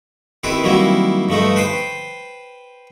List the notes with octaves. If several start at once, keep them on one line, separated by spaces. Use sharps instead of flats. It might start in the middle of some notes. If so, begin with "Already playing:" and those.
D#3 C4 E4 G4 B4
D#3 F#3 G3 A#3 C4 E4
G2 F3 A3 D#4
B4 C5 G5 C6